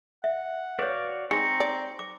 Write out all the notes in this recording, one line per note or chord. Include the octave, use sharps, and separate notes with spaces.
E5 F#5
F#4 B4 C#5 D5 F5
G#3 C4 D#4 A#5 C#6
D5
D6